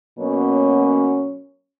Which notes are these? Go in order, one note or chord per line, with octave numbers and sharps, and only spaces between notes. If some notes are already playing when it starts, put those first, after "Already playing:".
B2 F#3 A#3 C#4